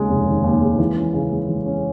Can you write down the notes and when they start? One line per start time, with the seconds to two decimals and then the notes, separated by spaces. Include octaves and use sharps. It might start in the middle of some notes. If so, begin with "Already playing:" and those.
Already playing: D#2 C#3 G#3
0.09 F1
0.26 D#3
0.44 D#2
0.62 G#3
0.79 E3
0.97 C#4
1.14 C#3
1.32 G#3
1.49 E3
1.66 C#4